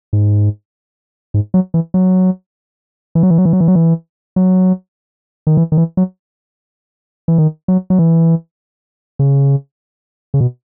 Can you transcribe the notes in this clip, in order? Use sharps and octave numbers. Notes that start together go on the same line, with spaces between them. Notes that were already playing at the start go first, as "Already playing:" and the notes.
G#2
G#2
F#3
E3
F#3
E3
F#3
E3
F#3
E3
F#3
E3
F#3
E3
F#3
D#3
E3
D#3
E3
F#3
E3
D#3
F#3
F#3
E3
C#3
C#3
B2